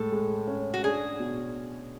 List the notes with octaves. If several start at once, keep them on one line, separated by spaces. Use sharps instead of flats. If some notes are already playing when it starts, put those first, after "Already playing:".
Already playing: A2 G#3 A4
G#3
C#4
F#4
D4 G#4
B2